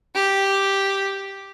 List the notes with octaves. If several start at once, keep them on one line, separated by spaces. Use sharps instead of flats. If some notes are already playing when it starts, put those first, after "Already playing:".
G4